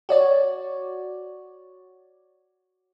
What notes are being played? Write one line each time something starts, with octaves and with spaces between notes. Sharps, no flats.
F#4 C#5 D5